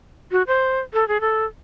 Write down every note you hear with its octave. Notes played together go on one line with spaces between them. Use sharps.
F#4
C5
A4
G#4
A4